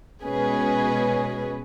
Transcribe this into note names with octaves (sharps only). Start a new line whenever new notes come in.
B2 G#3 C#4 G#4 B4